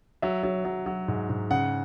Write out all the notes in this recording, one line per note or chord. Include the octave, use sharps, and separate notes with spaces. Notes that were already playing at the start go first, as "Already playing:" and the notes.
F#3 E5
F#3
F#3
F#3
G#2
G#2
C#3 F#5